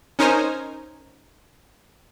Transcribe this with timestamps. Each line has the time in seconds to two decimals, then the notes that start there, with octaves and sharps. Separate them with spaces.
0.19 C#4 D#4 A#4 C5 G#5 A#5